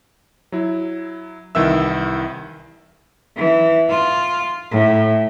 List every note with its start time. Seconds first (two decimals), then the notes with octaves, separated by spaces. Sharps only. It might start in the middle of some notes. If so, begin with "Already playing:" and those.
0.52 F#3 E4
1.55 C2 D#3 E3 E5 E6
3.37 E3
3.89 F4
4.71 A2